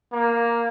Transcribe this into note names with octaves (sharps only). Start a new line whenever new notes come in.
A#3